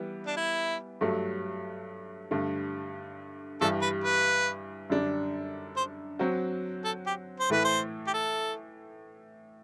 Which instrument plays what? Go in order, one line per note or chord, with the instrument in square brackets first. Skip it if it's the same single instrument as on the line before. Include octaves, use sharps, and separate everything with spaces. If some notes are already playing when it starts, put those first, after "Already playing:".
Already playing: [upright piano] E3 G3 B3
[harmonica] D4
E4
[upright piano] G2 F#3 A3
G2 D3 A3
[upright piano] G2 E3 G3 [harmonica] A4
[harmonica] B4
B4
[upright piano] F#2 D3 G3 D4
[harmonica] C5
[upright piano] F#3 C4 F#4
[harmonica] A4
G4
C5
[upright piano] A2 E3 A3 [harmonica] B4
[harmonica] C5
G4
A4